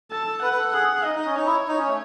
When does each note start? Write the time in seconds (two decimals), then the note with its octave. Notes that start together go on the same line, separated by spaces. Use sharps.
0.11 A4 A5
0.27 A4
0.42 B4 F#5
0.53 B4
0.57 A4
0.73 G#4 F#5
0.94 G#4
1.04 D#4 D#5
1.15 D#4
1.26 C#4
1.36 D#4 C#5
1.46 E4
1.68 D#4
1.78 C#4
1.88 A3